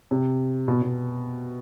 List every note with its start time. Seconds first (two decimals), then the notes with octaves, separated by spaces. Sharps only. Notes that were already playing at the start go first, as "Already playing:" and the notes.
0.11 C3
0.68 B2
0.82 B2